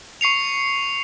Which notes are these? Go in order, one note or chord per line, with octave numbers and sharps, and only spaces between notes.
C#6 C7 C#7 F7